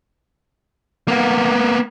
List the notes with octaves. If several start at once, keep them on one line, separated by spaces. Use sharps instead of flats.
A#3 B3